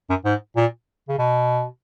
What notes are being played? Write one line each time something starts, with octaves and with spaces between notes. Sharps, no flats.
F#2
G#2
A#2
C#3
B2